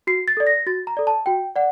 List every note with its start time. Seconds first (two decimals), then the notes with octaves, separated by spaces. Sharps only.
0.07 F#4 C7
0.28 A6
0.37 A4 D5
0.47 A#6
0.66 F#4 A6
0.87 A#5
0.97 A4 D5
1.07 A5
1.26 F#4 G5
1.55 D5 F#5